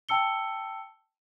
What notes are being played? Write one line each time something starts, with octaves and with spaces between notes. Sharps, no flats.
G5 A5 E6 C#7 G7